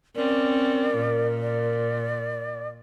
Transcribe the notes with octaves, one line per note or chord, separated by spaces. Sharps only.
C4 C#4 A#4 D5
A#2
D5